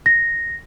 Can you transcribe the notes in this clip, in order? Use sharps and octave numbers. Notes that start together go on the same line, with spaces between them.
A#6